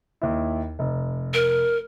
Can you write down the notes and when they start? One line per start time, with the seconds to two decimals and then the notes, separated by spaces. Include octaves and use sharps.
0.22 D#2 E4
0.79 F1
1.34 A#4